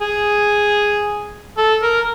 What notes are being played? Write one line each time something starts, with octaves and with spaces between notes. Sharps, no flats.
G#4
A4
A#4